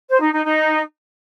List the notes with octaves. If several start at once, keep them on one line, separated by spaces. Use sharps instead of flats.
C5
D#4
D#4
D#4